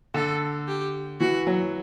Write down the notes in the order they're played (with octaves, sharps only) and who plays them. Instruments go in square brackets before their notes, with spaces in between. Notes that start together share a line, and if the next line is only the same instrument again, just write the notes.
[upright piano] D3 [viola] A4
[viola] G4
[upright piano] E3 [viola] F#4
[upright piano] F#3